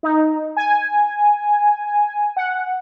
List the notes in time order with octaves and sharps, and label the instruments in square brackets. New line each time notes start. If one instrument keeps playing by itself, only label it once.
[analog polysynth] D#4
G#5
F#5